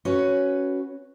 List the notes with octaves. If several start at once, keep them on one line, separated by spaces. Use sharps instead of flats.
C#4 F#4 B4 C#5